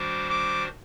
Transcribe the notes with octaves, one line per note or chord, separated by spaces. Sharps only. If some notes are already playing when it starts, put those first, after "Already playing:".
Already playing: D#3 G3 D4 F#4 C5 D6
D6